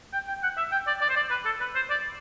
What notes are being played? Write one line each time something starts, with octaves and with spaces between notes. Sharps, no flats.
G5
G5
F#5
E5
G5
D5
D5
C5
D5
B4
A4
B4
C5
D5